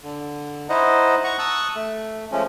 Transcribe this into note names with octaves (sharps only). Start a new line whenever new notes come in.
D3
D#4 E4 C5 D#5 F#5
F#5 A#5 C#6
A5 C#6 D#6 E6 F#6
A3
F3 G#3 A3 C#4